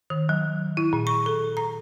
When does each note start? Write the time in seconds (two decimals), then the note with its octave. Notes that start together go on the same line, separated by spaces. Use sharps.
0.10 D#3
0.29 F#3
0.77 E4
0.93 A#2
1.07 C#6
1.26 A4
1.57 A#5